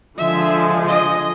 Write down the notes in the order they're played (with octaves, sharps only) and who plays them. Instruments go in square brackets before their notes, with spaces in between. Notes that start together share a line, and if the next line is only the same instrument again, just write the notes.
[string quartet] D3 F3 G#3 [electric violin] E5
[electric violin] D#5